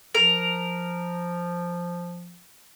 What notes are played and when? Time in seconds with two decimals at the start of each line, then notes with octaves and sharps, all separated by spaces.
0.15 F3 A#4